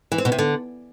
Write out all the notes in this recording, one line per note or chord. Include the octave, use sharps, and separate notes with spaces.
E3
C4
B2
C3
D3